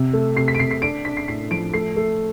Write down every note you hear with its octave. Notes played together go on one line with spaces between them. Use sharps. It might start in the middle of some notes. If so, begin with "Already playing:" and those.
Already playing: C3
A3
C3 C7
B6
D7
C3 C7
C7
D4 D7
D4 B6
C7
A2 C7
F3 D7
A3 C7
A3